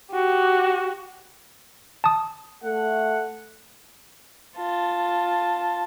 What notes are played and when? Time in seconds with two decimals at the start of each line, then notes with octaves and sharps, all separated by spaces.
0.11 F#4 G4
2.04 A5 D#6
2.63 A3 F#5
4.57 F4 A5